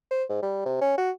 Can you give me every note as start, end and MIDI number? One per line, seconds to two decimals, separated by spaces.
0.11 0.24 72
0.29 0.39 44
0.42 0.65 55
0.65 0.80 48
0.81 0.95 61
0.98 1.11 66